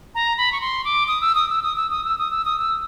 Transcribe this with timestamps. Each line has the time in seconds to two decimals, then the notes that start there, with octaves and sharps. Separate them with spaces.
0.15 A#5
0.38 B5
0.52 C#6
0.61 C6
0.85 D6
1.08 D#6
1.21 E6
1.35 D#6
1.50 E6
1.63 D#6
1.76 E6
1.90 D#6
2.05 E6
2.18 D#6
2.31 E6
2.45 D#6
2.59 E6